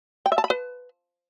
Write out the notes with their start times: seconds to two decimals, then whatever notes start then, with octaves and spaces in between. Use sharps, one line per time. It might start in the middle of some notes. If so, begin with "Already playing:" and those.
0.26 G5
0.32 E5
0.38 A5
0.44 B5
0.50 B4